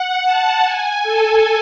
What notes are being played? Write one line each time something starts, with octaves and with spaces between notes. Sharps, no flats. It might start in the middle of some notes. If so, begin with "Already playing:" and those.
Already playing: F#5
A5
G#5
A4